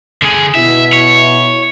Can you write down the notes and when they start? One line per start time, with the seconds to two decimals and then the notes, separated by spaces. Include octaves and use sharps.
0.22 D3 G#4
0.55 B2 E4 E5
0.93 C#5